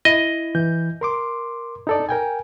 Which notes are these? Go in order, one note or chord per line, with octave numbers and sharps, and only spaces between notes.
E4 D#5
E3 G6
A#4 C6 D6
D#4 A4 D5
A#4 G5 G#5